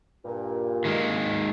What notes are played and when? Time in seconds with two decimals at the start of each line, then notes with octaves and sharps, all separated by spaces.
0.25 G2 A#2
0.85 D#3 G#3 A#3